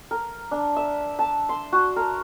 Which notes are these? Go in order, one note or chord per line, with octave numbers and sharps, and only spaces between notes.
A#4
D4
E5
A5
C6
F#4
A#4